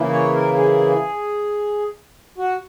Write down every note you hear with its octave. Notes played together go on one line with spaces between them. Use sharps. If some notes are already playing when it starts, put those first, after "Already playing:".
Already playing: C#3 E3 A#3 E4
C#5
A#4
G#4
F#4